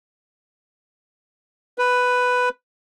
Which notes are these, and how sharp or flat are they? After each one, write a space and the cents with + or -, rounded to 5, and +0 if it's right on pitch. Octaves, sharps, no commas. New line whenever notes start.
B4 +5